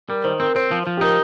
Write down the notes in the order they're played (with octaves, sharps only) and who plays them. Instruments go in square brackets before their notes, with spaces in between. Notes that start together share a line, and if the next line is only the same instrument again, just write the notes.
[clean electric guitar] G3 [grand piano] A#4
[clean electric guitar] D#3 [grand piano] C5
[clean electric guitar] C4 [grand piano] A#4
[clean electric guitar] C4 [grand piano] C5
[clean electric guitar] F3
F3
[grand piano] G4
[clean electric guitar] D#4 [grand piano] A#4